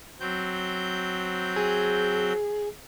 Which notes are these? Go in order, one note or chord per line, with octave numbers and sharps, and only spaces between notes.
F#3 C4 G6
G#4